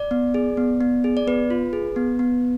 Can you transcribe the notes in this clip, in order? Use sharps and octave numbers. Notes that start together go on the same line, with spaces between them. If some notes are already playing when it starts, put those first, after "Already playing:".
Already playing: D5
B3
G#4
B3
B3
G#4
D5
B3 B4
F4
G#4
B3
B3